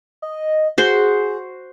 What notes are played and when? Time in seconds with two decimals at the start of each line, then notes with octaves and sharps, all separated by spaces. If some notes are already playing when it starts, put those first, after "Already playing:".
0.22 D#5
0.78 F#4 G#4 C5